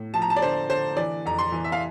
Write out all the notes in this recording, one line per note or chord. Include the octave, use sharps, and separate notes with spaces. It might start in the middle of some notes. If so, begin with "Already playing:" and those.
Already playing: A2
F3 A5
A#5
A5
D5
D3 C5
D3 C5
E3 D5
F2 A#5
C6
E3
E5
F5